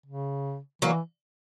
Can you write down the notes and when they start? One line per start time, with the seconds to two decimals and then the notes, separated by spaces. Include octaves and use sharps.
0.06 C#3
0.82 E3 F#3 A#3